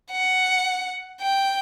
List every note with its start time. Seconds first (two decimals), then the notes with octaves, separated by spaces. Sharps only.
0.11 F#5
1.22 G5